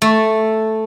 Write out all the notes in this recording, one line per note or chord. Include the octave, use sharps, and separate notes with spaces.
A3